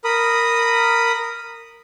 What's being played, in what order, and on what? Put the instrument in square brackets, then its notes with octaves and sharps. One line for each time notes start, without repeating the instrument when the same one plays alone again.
[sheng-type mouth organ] A#4 B5 D#6